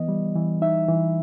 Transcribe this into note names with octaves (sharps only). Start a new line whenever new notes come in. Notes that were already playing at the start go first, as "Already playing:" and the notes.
Already playing: E3 B3 D#5
G3
E3
D#4 E5
E3